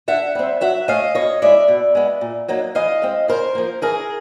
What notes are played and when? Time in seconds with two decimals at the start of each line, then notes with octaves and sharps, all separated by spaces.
0.08 D3 E5 F#5
0.35 G3 C4
0.61 F#3 E5 F#5
0.88 A3 C#4 D#5 F5
1.15 B2 C#5 D#5
1.42 G#3 C#4 E4 D5 E5
1.68 B2
1.95 G#3 B3
2.21 A#2
2.48 F#3 A#3 D#4
2.75 E3 D#5 F5
3.02 G#3 C4
3.28 C#3 A#4 C5
3.55 F3 A#3
3.82 E3 G#4 A#4